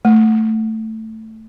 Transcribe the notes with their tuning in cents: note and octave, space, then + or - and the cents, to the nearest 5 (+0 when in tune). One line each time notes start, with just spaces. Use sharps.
A3 +5